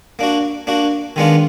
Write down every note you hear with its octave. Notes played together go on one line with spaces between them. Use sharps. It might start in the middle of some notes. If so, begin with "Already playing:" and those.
A#3 D4 F#4
A#3 D4 F#4
D#3 G#3 B3 D4 F4